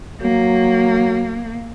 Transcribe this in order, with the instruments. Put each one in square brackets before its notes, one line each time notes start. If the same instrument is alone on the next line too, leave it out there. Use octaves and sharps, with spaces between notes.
[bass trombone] F#3 [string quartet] A#3